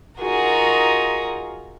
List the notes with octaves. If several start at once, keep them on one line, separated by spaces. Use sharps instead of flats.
D#4 F4 F#4 G#4 A#4